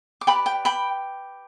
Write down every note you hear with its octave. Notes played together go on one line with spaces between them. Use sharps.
D6
G4 B4 D5 G5 B5
G5
G5 B5